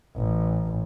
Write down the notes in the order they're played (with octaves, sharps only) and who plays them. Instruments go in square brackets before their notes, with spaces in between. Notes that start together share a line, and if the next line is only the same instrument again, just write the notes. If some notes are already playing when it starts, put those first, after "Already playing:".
[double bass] A1